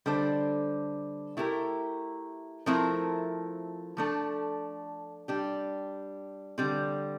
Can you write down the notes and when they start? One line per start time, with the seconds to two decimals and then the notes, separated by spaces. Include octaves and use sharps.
0.06 D3 G3 D4 A4 C5
1.37 A3 E4 G4 A#4
2.66 F3 A3 C4 E4 A#4
3.97 F3 A3 D4 A4
5.28 G3 D4 G4
6.58 D3 G3 C4